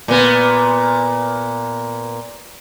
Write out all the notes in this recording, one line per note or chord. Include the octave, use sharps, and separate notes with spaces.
A#2 B3